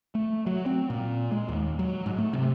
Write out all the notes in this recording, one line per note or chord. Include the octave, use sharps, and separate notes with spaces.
A3
F#3
C4
A#2
G#3
D#2
F#3
G#2
A3
C3